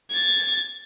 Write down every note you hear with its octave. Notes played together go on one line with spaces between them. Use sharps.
G#6 A6